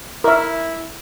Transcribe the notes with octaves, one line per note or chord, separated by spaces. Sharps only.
E4 A#4 E5